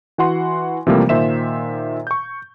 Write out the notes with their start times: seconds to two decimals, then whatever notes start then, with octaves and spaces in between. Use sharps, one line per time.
0.18 E3 F#4 F#5 C6
0.87 C3 E3 F3 G3 A3 A#3
1.09 A#2 D#3 C5 E5 E7
2.07 C#6 G6